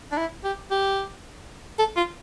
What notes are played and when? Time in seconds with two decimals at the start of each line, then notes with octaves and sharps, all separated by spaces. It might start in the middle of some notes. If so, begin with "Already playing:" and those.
0.12 D4
0.17 E4
0.44 G4
0.71 G4
1.79 A4
1.97 F4